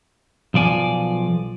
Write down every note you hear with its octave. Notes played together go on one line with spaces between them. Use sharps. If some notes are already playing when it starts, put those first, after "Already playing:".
B1 F3 D5 G#5